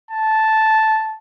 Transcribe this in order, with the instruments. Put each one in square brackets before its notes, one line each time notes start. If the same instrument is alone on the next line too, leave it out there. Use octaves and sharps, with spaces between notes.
[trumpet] A5